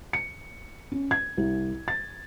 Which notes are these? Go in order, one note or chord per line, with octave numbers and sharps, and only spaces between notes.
C#7
C#4
G#6
C2
A6